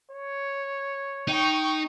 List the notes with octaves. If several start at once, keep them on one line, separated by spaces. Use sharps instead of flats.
C#5
D#4 G5 C#6